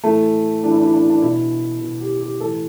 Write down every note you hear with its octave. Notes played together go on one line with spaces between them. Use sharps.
A2 E3 A3
A2 E3 D4
E4
D4
E4
D4
E4
D4
B2 E4
B2
G4
G4
A2 E3 A4